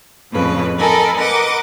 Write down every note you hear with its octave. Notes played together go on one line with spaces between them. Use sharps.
F2 A2 C#3 B4
A4 A#4 D#5 G#5 B5
A#4 B4 D#5 F#5 D6